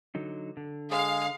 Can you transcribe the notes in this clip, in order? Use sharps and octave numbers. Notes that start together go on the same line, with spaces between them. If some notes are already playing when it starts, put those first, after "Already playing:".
D3 F#3 D#4
D3
G#3 G#4 F5